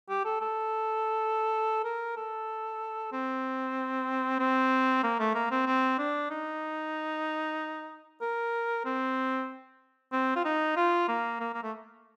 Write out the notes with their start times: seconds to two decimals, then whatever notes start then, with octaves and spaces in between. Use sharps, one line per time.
0.10 G4
0.25 A4
0.41 A4
1.84 A#4
2.17 A4
3.12 C4
4.39 C4
5.03 A#3
5.19 A3
5.35 A#3
5.51 C4
5.66 C4
5.98 D4
6.30 D#4
8.21 A#4
8.86 C4
10.13 C4
10.36 F4
10.45 D#4
10.76 F4
11.08 A#3
11.40 A#3
11.54 A#3
11.63 A3